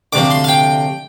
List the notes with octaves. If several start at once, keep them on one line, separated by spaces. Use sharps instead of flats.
D2 C3 F3 D6
C6
F5
G5